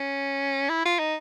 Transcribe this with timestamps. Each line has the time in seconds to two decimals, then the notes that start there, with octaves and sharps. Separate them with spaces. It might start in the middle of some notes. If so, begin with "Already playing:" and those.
Already playing: C#4
0.69 E4
0.85 F4
0.99 D#4